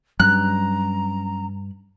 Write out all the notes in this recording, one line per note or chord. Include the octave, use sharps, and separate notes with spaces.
G2 F#3 C#4 A#5 F#6